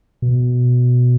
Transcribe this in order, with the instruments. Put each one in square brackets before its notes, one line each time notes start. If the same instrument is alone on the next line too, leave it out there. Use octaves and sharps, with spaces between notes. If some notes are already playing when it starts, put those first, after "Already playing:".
[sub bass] B2